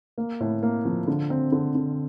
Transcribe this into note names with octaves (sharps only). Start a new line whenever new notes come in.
A#3
A2
A#3
F3
D3
C4
D3
D3